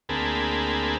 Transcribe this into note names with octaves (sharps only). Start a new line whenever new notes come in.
D2 A#3 C4 G#4 A5 B5